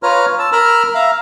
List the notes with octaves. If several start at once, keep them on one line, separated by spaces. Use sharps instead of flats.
F4 B4 C#5 A#5 F6
A5 E6
A#4 A#5 B5 E6 F6
E5 F5 A#5